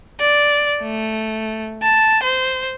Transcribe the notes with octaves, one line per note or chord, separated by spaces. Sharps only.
D5
A3
A5
C5